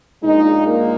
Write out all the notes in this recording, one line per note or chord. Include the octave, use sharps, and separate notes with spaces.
A#1 A#2 G#3 D#4
A#3